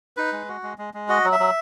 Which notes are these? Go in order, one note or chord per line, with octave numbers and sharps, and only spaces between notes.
D#4 B4
G#3
F#4
G#3
G#3
G#3
F#4 D#5
F#3
E5
F#3